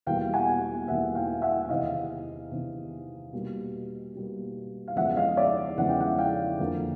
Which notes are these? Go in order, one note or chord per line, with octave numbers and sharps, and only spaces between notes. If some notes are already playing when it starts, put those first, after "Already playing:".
E2 B2 G3 A#3 F5 G5
F#5 G#5
E2 B2 G3 A#3 E5 F#5
F5 G5
E5 F#5
F#5
E2 C3 D#3 D#5 F5
E2 C3 D#3
B2 G3 A#3
B2 G3 A#3
F5
E2 C#3 F3 G#3 E5 F#5
D#5 F5
D5 E5
E2 C#3 F3 G#3 F#5
G5
E5 F#5
F5 G5
F2 D3 F3 A#3